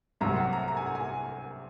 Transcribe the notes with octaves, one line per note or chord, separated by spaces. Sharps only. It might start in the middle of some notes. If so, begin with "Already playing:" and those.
C2 C3 F#3 A#5
F#5
A#5
A#5
G#5
F#5
G#5